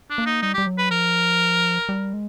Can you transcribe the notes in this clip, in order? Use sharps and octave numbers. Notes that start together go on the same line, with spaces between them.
D4
A#3
D#4
G3 D#4
G3 G4
F#3
B4
F3 A#4
G3
G#3